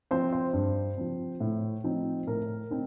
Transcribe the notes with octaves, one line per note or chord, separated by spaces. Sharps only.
F3 C4 C5
C5
G2
F3 C4
A2
F3 C4 D#4
A2 A#4
C4 D#4